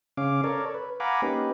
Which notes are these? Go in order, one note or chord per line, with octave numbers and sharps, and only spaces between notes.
C#3 C#4 F5 D6
A4 A#4 C#5 D5
B4
F5 F#5 G#5 A#5 B5 D6
A#3 C#4 D#4 G4 B4